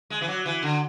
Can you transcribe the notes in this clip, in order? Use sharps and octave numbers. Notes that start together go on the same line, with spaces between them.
G#3
E3
F#3
E3
D3